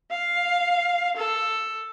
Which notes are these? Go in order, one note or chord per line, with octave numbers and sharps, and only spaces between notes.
F5
A4